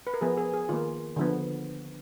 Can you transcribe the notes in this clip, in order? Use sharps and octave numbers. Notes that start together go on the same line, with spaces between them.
B4
A#4
F3 B3 G#4
G#4
G#4
D#3 A#3 F4
D3 F3 B3